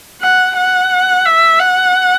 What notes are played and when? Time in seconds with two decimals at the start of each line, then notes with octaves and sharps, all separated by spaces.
0.22 F#5
0.57 F#5
1.25 E5
1.60 F#5